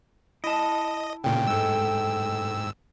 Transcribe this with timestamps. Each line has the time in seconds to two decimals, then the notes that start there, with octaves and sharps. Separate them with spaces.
0.44 E4 D#5 A5
1.24 A#2 C#3 G5
1.47 G#2 G#3 A4 E6